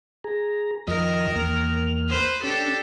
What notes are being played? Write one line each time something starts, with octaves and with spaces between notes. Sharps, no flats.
G#4 A#5
F2 D#3 F3 A#4 D#5
E2 A#3 F6
B4 C5
C#4 D4 G4 A4